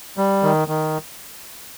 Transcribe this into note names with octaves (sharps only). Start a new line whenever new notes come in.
G3
D#3
D#3